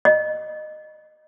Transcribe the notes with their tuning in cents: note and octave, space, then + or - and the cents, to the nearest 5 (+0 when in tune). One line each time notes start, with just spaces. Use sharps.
D#5 -20